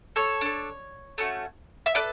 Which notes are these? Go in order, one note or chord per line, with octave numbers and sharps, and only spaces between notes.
A4 C#5
D4 A4
A3 C#4 F#4
E5
A4 B4 D5